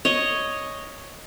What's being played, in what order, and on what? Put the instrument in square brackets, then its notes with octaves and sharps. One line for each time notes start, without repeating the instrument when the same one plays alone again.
[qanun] C#5 D#5